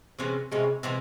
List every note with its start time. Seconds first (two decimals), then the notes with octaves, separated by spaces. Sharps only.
0.19 C3 E3 G#3 C#4
0.51 C3 E3 G#3 C#4
0.83 C3 E3 G#3